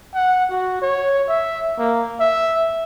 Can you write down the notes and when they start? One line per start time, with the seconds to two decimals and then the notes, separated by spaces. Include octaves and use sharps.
0.14 F#5
0.50 F#4
0.82 C#5
1.28 E5
1.79 A#3
2.20 E5